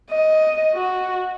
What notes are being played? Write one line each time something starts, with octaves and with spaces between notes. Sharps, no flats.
D#5
F#4